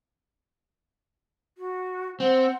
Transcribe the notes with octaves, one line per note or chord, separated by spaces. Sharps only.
F#4
C4 C5 F#5